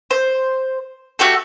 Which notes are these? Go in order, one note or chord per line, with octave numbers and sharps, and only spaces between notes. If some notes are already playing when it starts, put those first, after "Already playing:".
C5
A3 F#4 G4 A4